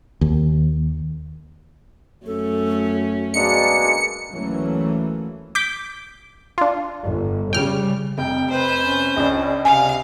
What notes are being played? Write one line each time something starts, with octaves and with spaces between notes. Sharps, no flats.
D#2
F#2 A3 C#4 A4
B2 G#3 A#3 D4 C#7
D2 E3 F#3 A3 A#3 C#4
D6 G6 B6
D4 F4
G1
C#3 G3 G5 F6
F1 G5
B4 C5
C#4
C#2 C#4 D4
C3 F5 G#5